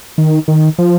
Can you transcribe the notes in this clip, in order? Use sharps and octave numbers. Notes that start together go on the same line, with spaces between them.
D#3
D#3
F3